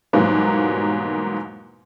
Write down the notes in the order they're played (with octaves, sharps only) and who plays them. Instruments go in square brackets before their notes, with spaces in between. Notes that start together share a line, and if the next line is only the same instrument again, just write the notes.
[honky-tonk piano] E2 G#2 B2 F#3 G3 A#3